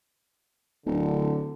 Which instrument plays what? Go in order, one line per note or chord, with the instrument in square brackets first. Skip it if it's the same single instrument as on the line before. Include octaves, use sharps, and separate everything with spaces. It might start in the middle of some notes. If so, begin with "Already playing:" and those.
[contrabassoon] D1 [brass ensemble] D3